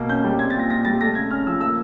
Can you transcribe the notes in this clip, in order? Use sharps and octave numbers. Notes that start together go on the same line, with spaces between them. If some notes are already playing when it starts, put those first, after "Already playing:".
Already playing: B2 A#3
C#4 G6
G3
C4 G#6
A6
A#2 A#6
A#2 A#6
G3 A6
A3 A#6
C#3 G#6
C#4 F6
F3 E6
A#3 E6